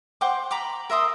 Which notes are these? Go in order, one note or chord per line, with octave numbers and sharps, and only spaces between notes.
C5 F#5 G5 D6
A#5 B5 D6
A#4 E5 C6 D#6